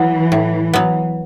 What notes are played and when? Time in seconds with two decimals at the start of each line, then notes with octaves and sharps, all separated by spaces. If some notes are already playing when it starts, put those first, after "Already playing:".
Already playing: E3 F#3 B3
0.32 A2
0.74 F#3 B3